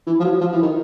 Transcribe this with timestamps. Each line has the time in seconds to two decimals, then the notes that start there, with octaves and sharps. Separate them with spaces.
0.07 E3
0.20 F3
0.24 F#3
0.40 F3
0.52 E3
0.62 D#3